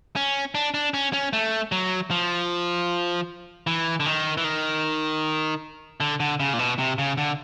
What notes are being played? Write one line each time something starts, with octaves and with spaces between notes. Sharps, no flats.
C#4
D4
D4
C#4
C#4
A3
F#3
F3
E3
D3
D#3
E3
D#3
D3
D3
C#3
A#2
B2
C3
C#3
D3